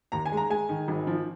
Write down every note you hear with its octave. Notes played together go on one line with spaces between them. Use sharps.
D#2 A#5
G#5
G#3
A#5
G#3 G#5
D#3
G#1
F3